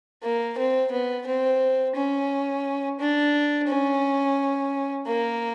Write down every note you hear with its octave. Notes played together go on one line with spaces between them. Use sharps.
A#3
C4
B3
C4
C#4
D4
C#4
A#3